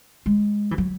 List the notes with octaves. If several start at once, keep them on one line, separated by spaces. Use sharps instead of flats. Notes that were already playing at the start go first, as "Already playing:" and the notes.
G#3
E3
F#3